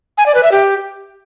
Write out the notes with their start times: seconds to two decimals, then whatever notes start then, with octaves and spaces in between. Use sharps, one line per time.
0.18 G#5
0.26 D5
0.35 B4
0.43 E5
0.52 G4